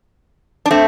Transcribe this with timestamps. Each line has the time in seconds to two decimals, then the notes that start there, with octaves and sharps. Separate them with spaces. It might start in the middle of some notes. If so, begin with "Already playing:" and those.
0.66 D4
0.71 A3 C4